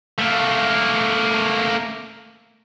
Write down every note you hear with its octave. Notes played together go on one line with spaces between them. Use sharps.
A3 A#3